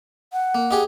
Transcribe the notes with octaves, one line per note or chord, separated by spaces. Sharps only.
F#5
A#3
D#4 G4 G#4